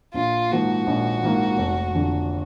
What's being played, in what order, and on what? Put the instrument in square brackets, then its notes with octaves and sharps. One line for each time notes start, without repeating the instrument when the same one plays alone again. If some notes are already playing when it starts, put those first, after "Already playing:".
[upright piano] A#1 [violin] F4
[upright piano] G#2 F3 A#3 [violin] F#4
[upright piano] A#1
G#2 F3 A#3
F1
F2 D3